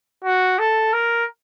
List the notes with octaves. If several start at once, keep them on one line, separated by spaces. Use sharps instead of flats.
F#4
A4
A#4